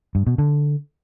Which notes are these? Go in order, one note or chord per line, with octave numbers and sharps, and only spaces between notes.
G2
B2
D3